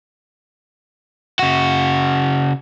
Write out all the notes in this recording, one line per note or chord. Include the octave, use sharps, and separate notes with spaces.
C#3 F#4